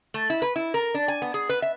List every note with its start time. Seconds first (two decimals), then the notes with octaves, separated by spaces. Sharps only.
0.14 A3
0.30 E4
0.42 B4
0.56 E4
0.74 A#4
0.94 D4
1.08 G#5
1.22 B3
1.34 G#4
1.49 B4
1.62 E5